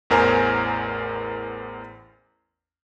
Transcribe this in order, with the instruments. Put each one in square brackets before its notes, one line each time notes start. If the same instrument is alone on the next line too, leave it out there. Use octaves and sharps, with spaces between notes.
[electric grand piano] A1 E2 A#4 C5 G#5 A#5